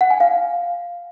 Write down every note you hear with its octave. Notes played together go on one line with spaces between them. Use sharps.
F#5
G#5
F5